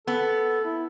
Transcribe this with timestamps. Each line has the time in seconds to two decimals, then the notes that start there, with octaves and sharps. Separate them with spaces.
0.07 B3 A4
0.65 E4